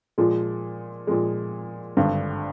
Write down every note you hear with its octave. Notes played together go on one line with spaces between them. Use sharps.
A#2 F3 G#3
A#2 F3 G#3
G#1 G2 D3